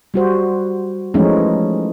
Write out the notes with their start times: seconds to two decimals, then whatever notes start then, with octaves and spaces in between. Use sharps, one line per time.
0.14 G3 F#4 C5
1.14 E3 F3 G#3 A3 C#4 D#4